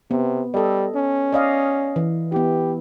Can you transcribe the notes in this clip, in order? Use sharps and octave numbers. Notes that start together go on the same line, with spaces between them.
C3 B3
G3 A4 D#5
C#4
D5 D#5 F5
E3
B3 E4 G4